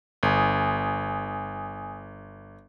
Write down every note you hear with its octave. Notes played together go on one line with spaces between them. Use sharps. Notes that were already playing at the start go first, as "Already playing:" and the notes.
G1 G#5 D#6